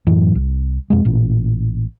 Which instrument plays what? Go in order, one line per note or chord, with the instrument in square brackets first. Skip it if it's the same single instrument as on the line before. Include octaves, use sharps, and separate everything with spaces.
[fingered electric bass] F#2 A2 E3 F#3
C2
F2 B2 G#3
A1 A#2